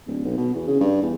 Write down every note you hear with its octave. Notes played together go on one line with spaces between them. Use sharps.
D1
B1
B2
E2
C#3
G2
E2